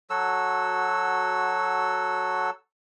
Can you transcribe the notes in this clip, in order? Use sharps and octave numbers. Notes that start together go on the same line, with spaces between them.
F#3 F#4 A4 E6